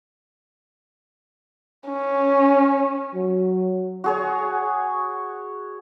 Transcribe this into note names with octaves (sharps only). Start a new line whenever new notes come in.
C#4
F#3
F#4 G#4 C#5